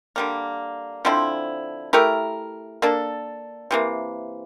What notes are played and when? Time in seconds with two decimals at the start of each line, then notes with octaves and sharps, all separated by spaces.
0.16 D3 G3 A#3
1.05 D3 F3 C4 E4
1.93 A3 E4 G4 A#4
2.82 A#3 D4 A4
3.71 C3 E3 A#3